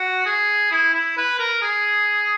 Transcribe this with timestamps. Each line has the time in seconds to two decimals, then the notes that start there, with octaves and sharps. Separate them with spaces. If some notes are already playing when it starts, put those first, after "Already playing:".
Already playing: F#4
0.26 G#4
0.72 E4
0.94 E4
1.17 B4
1.40 A#4
1.62 G#4